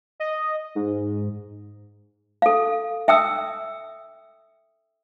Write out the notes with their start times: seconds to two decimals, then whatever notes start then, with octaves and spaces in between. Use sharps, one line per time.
0.20 D#5
0.75 G#2
2.42 A4 F5
3.08 E5 G5 D#6 E6